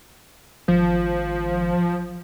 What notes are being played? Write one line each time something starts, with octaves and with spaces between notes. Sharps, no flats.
G#1 F3